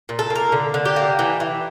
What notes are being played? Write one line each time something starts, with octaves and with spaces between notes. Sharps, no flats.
A#2
A4
A#3
A#4
D3
D3
G4
A#3
E3
E3